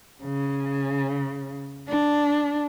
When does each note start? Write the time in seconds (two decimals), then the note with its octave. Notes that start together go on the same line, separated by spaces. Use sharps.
0.24 C#3
1.89 D4